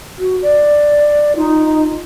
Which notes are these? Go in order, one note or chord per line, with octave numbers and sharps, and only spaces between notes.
F#4
D5
D#4 F4